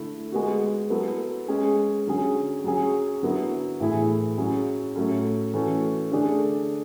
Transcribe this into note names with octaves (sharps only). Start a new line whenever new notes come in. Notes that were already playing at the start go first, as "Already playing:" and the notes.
Already playing: D3 A3 E4
G#3 B3 F#4
F#3 B3 E4 A4
G#3 C#4 G#4
D3 F#3 C#4 G#4
F#3 C#4 G#4
D3 F#3 B3 E4
A2 E3 A3 E4 G#4
F#3 C#4 G#4
A2 F#3 A3 C#4
E3 A3 C#4 F#4 A4
D3 A3 D4 G#4